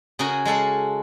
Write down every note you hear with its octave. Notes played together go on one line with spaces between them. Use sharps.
C#3 F#4 G#4 A#4
G#3 F#4 A4 F5